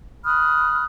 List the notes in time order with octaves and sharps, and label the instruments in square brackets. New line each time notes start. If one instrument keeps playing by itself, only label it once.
[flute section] B5 D#6 F6 F#6